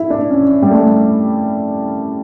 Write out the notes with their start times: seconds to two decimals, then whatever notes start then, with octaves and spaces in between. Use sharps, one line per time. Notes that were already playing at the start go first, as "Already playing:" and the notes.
Already playing: E4
0.10 D4
0.30 C#4
0.62 G3
0.70 A3